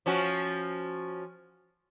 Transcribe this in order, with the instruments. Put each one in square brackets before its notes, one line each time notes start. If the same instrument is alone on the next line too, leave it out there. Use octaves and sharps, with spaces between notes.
[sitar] F3 C#4 F#4